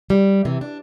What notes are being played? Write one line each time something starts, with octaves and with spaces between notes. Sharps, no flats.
G3
C3 E3
D4